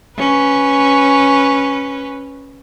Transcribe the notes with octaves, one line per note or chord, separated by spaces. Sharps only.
C#4 B4